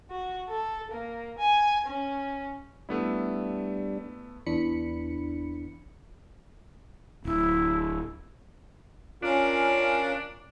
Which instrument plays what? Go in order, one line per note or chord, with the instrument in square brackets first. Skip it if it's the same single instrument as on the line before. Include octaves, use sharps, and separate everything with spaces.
[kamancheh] F#4
A4
A#3
G#5
C#4
[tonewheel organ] G3 D4 [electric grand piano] A3 B3 E4
[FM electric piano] E2 E3 D4 B5 C#7
[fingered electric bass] D1 [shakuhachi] E4
[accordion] C#4 A#4 F5 [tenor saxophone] D4 [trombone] F4